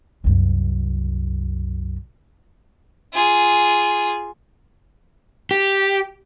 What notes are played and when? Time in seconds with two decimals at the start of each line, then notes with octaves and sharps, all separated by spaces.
0.24 C2 F#2
3.13 F4 G#4
5.51 G4